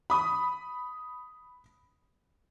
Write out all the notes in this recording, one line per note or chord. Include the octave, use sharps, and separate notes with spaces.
B5 D#6